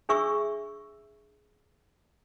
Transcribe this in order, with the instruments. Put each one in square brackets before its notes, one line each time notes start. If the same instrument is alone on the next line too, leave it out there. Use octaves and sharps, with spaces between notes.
[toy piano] D4 G#4 E5 C#6 E6